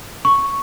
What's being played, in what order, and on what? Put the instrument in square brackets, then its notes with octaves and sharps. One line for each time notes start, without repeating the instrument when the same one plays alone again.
[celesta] C#6